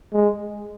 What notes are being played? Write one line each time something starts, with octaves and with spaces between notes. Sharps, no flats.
G#3